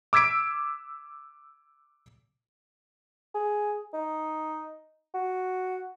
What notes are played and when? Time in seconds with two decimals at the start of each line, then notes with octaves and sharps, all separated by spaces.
0.13 D6 E6 G#6 B6 D7
3.34 G#4
3.94 D#4
5.14 F#4